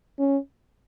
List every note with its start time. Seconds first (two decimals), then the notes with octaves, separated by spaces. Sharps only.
0.19 C#4